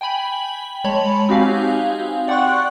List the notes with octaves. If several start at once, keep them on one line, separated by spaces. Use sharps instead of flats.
G5 G#5 B5 F#7
G#3 C#5 A5 B5 F#7
C4 D#4 F#4 G4 F5 G#5
D5 F#5 G5 C6 C#6 F#6